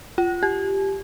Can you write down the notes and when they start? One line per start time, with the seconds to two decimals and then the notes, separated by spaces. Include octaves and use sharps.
0.18 F4
0.43 G4